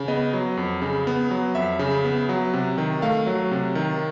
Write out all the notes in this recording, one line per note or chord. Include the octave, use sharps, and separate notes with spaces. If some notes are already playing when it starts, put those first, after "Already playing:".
Already playing: C#3
B3 D#5
F#3
F2
C#3
B3
F#3
F2 E5
C#3
B3
F#3
C3
D#3
A3 F5
F#3
C3
D#3